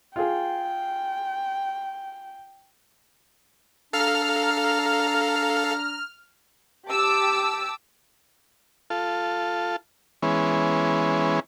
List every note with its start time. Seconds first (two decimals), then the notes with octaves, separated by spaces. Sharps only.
0.16 F4 G#4 G5
3.93 D4 A4 F5 A#5 F6
6.89 G4 A5 D6 E6
8.90 F4 A4
10.22 E3 G#3 B3 C#4